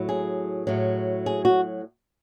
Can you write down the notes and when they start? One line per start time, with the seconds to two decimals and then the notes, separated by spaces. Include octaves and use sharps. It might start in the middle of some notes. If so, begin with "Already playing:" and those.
Already playing: A2 F#3
0.09 G#4
0.67 A2 F#3
1.26 G#4
1.45 F#4